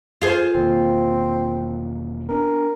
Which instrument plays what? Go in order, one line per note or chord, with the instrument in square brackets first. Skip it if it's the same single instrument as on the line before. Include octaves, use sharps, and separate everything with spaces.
[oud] F4 G#4 C5
[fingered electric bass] E1 D#3 A#3 [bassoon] C4
[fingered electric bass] B3 D4 [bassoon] A#4